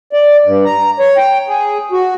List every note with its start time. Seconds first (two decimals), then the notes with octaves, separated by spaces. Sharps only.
0.13 D5
0.46 G2
0.65 A#5
0.99 C#5
1.17 G5
1.48 G#4
1.92 F#4